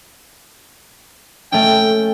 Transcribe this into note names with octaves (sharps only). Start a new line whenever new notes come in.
A3 C#4 G5